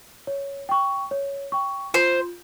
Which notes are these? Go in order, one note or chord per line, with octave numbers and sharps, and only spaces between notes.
C#5
G5 C#6
C#5
G5 C#6
F4 C5